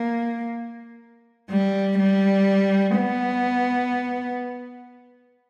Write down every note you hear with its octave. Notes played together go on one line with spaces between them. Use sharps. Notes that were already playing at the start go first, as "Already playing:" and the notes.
Already playing: A#3
G3
G3
B3